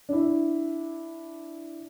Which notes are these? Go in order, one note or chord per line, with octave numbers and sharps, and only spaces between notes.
D4 E4